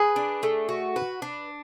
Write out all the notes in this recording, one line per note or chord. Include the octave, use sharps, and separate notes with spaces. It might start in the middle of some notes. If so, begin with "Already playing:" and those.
Already playing: G#4 B4
D4
A3
F#4
B4
D4